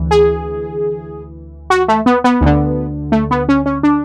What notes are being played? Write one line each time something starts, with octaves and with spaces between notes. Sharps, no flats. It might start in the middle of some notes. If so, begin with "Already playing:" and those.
Already playing: D2 E3
G#4
F#4
A3
B3
B3
D2 D3
A3
B3
C#4
C#4
D4